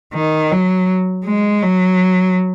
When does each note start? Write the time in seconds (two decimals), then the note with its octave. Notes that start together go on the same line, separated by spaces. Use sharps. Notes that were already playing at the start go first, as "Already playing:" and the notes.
0.14 D#3
0.52 F#3
1.25 G#3
1.63 F#3